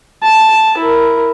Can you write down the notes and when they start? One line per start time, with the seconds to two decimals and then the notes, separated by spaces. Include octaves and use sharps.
0.23 A5
0.78 E4 A#4